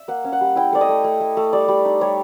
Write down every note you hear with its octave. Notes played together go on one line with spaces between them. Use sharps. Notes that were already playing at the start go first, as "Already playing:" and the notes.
Already playing: E5
A#3 F#5
C#4
F#5
G3
E4 G5
A3 D5
D#5
A3
A3
A3
A3
G3 D5
G3
D#4
G3 C#5